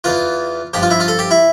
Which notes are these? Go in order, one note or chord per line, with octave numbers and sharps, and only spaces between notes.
E2 E3 F4
G2 F3 G4
F4
E4
F4
A4
G4
E4